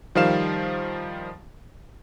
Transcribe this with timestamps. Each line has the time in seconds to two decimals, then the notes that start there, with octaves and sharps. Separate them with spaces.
0.15 D#3 F3 G3 F5 E7